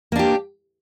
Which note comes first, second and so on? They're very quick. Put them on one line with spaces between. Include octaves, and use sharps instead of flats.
A#3 D4 G4